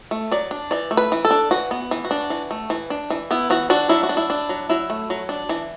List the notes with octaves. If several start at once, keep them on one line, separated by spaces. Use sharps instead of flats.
A3
F#3 D5
D4
E3 D5
A3
B4
E3
A4
D4
E3 F#4
B3
E3
F#4
D4
E3
A3
E3
D4
E3
B3 E4
E3 F#4
D4 F#4
F#3 E4
F#4
D4
E4
D4
F#3
F#3 E4
A3
F#3
D4
E3